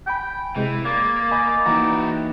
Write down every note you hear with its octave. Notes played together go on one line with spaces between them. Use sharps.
G5 G#5 B5
C3 E3 G#3
A#3 D5 G#6
D#5 G#5 B5 G6
E3 A#3 D#4 F#4 G4 A#5